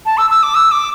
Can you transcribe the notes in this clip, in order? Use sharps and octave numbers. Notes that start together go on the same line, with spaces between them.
A5
E6
E6
D6
E6
D6